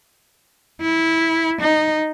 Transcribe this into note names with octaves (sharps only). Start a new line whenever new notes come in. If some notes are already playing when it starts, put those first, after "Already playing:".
E4
D#4